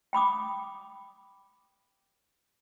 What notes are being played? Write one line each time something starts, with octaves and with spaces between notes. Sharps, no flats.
G5 B5 D6 D#6